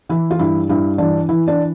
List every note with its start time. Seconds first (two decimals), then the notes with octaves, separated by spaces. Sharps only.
0.09 E3 E4
0.31 F4
0.39 G2 E4
0.69 G2 E4
0.98 E3 D4
1.29 E3 E4
1.48 D4